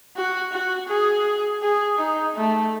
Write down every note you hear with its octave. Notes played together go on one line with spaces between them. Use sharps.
F#4
F#4
G#4
G#4
D#4
A3